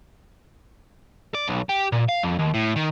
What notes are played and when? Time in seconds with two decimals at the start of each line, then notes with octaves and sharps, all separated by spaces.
1.35 D5
1.48 B1
1.69 G4
1.92 A#2
2.09 F5
2.23 F2
2.39 D#2
2.54 A2
2.76 D#3